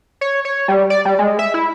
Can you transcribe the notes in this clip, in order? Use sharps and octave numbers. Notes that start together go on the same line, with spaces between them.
C#5
C#5
G3
D5
G3
G#3
E5
E4